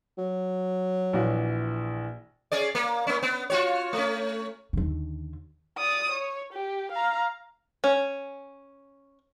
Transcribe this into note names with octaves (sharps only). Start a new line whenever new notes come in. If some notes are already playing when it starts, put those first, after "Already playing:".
F#3
A#1 E3 F#4
C#4 G#4 D5
A#3
A#3 C#4
B3
F4 F#4 C#5
A3 C#4
D#2 D3
D5 D#6
C#5
G4
F5 A#5
C#4